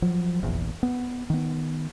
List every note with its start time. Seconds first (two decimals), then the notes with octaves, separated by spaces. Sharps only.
0.02 F3 F#3
0.43 F1 A#1 E2
0.83 B3
1.30 D#3 B3